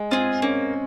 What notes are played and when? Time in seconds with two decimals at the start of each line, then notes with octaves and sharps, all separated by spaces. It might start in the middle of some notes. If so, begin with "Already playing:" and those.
Already playing: G#3
0.11 C4 F4 G#4
0.42 A#3 C#4